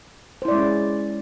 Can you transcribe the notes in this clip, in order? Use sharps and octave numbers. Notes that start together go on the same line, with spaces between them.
G#3 C#4 E4 C5 D5